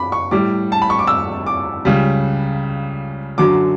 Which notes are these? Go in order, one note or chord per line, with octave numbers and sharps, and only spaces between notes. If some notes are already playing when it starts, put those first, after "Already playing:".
Already playing: B5 D6
C#6
A2 G3 D6
A5
B5
C#6
D6
E6
D6
C#2 C#3 G3
F#2 D3 F#3 D6